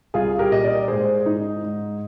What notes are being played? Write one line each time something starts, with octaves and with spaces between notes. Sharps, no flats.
C2 F4 G#4
G4 A#4
A#2 D#5
A#4 D5
G#2 G#4 C5
G#2 D#4
G#2